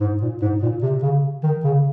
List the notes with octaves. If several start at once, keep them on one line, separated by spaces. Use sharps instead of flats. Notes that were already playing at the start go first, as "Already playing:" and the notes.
G#2
A#2
G#2
A#2
C3
C#3
D#3
C#3